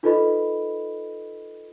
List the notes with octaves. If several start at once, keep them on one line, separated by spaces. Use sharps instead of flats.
D#4 F4 A4 B4 D#5 B5